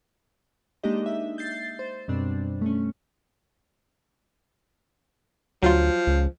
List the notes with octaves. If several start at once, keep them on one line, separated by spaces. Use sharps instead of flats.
G#3 A#3 D4 D#4 G4 D#5
E5
G6 A6 C7
C5
F#2 B2 G3 C4 D4
A3 C#4
D2 F3 F#3 F4
C#2